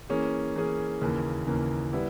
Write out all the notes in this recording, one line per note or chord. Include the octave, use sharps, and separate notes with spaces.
E3 A#3 C#4 G#4
E3 A#3 C#4 G#4
D#2 C#3 E3 A#3
D#2 C#3 E3 A#3
G3 B3 E4